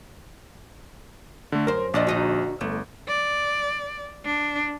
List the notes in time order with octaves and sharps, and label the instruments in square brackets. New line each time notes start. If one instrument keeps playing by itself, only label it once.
[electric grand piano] D3 A3
[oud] F#2 C5 [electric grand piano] A#4
[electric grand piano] A#1 [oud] D4 D5 D#5
[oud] D3 D#4 F#4
[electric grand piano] G1 [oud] A3
[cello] D5
D4